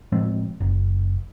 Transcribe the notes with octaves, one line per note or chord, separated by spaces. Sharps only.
A2 F3 G#3 C4
F#1